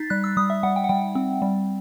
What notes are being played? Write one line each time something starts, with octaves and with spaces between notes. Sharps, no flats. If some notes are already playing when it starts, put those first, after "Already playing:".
Already playing: D#4 A6 B6 C7
G3 F#6
E6
G3 D#6
E5
G3 F#5
G5
F#5
G3 G5
C4
G3